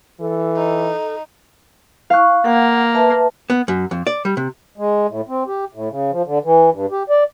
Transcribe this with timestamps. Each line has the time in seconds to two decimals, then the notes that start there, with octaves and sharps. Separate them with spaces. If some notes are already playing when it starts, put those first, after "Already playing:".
0.20 E3 A4
0.57 D#4
2.10 E4 F5 C#6 F#6
2.45 A#3 F#5
2.95 B4 E5 A5
3.50 B3
3.68 F#2
3.91 F2
4.07 D5
4.25 G3
4.37 C3
4.78 G#3
5.09 A2
5.28 C4
5.47 G4
5.74 A2
5.90 C#3
6.11 F3
6.26 D3
6.44 E3
6.72 G2
6.91 G4
7.09 D5